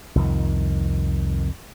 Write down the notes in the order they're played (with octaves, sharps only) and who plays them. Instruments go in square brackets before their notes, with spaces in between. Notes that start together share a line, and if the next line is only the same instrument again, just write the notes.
[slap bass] C2 F2 D#3